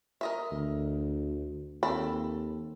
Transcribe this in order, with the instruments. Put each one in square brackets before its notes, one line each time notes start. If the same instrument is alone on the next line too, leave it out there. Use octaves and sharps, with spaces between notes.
[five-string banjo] A#4 D#5 E5
[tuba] D2
[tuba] D#2 [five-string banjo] C4 A4 B5